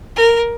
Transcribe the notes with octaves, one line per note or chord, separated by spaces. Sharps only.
A#4